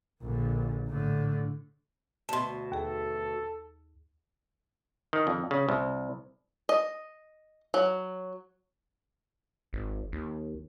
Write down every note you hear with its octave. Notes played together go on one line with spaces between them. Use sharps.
A#1 D3
A2 D3
D2 B2 A5 C6
D#2 G#4 A4
D#3
F2
C#3
C2
D#5
F#3
G#1
D#2